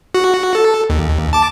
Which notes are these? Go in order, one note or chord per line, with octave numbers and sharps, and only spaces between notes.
F#4
A4
D#2
A5 D6